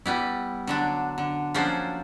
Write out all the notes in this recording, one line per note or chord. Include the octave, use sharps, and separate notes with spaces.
G3 B3 E4
D3 F#3 D4
D3
F3 F#3 A#3 C#4 D4 C5